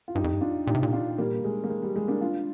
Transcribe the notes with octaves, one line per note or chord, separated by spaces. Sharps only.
F4
G2 D#4 G4
F2
G2
D4 F4
A#2 D#4 G4
C3
A#2
D4 F4
G3 A#3
G#3
A#3
G#3
G3
G#3
A#3 D4
D4 F4